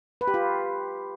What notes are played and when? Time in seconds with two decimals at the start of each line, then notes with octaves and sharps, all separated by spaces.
0.21 B4
0.27 G4
0.34 F4